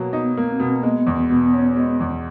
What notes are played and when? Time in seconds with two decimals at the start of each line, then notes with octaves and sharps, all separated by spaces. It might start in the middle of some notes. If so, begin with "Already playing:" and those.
Already playing: B2 F#3 A#3
0.13 B3 D#4
0.37 A#3
0.49 C4
0.60 B2
0.76 A#3
0.83 G#3 B3
1.07 E2
1.19 B3
1.30 B2
1.54 C#4
1.77 G#3
2.00 E2